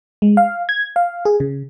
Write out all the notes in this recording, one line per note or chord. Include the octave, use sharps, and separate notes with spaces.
G#3
F5
G#6
F5
G#4
C#3